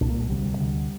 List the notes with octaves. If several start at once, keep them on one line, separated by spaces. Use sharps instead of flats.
C2 A#2 D4
A#3
G#3
D2 C3 G3
D2 D3